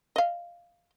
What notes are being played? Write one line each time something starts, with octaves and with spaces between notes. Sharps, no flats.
D#5 F5